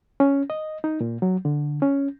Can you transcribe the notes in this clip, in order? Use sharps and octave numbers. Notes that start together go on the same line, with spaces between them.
C#4
D#5
D#4
A#2
F#3
D3
C#4